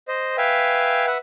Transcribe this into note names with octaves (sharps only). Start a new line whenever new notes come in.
C5 D#5
B4 E5 F5 G5 G#5
B4 E5 F#5